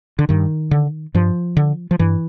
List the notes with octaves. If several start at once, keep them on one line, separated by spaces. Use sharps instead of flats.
D3
G2 D#3
D3
G2 F3
D3
F3
G2 E3